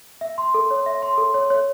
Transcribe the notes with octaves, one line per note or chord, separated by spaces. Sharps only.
E5
C6
A4
C#5
E5
C6
A4
C#5
C#5